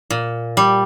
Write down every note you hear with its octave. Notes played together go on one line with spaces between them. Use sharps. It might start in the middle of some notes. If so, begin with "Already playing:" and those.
A#2
G3